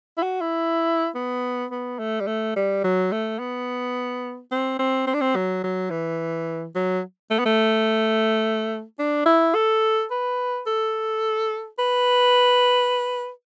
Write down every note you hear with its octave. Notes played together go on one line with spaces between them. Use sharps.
E4
F#4
E4
B3
B3
A3
G3
A3
G3
F#3
A3
B3
C4
C4
C4
D4
C4
F#3
F#3
E3
F#3
A3
B3
A3
D4
E4
A4
B4
A4
B4